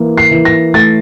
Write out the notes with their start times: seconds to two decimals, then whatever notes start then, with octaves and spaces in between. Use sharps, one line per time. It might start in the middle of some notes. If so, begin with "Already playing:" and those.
Already playing: E3 A#3
0.18 C7
0.31 E3
0.45 A#6
0.74 A3 A6